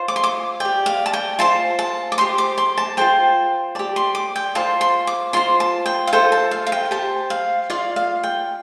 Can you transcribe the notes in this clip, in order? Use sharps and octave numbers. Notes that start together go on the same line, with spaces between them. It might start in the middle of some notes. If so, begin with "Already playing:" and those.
Already playing: F4 C5
D6
C6
D6
G4 D5 G5
F5
A5
G5
F4 C5 A5
A5
D6
G4 C5 C6
D6
C6
A5
F4 A4 C5 G5
G4 D5 A5
C6
D6
G5
F4 C5 A5
C6
D6
F4 C5 C6
A5
G5
F5
F4 A4 C5 G5
A5
F5
F5
G5
G4 C5 A5
F5
F4 D5 F5
F5
G5